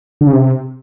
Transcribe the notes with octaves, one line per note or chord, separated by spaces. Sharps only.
D3
C#3
C3